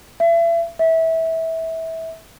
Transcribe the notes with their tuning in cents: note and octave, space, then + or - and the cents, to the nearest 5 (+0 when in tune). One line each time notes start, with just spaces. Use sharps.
E5 +35
E5 -20